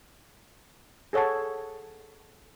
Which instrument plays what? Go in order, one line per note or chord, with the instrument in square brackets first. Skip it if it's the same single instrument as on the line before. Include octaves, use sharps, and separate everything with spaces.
[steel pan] G#4 A4 C#5 F#5 A5